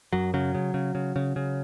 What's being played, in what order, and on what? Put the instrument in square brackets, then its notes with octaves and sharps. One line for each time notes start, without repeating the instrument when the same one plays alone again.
[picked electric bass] F#2 F#3
C#3 F#3
C#3
C#3
C#3
C#3
C#3